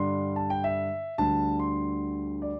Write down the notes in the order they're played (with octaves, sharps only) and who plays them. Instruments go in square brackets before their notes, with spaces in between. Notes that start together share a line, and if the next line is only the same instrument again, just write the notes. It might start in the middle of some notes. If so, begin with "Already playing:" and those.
Already playing: [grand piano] G2 D3 G3 D4 C6
A5
G5
E5
D2 D3 G3 D4 A5
C6
D5